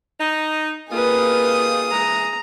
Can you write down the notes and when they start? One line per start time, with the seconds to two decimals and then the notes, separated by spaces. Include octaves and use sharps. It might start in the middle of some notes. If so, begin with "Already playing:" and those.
0.19 D#4
0.91 C3 A#3 D#4 F4 G#4 B4 D#6
1.91 E3 G#3 A#5